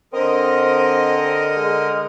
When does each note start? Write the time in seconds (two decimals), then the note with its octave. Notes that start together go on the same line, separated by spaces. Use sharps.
0.13 D3 C4 A#4 D#5
1.56 G#3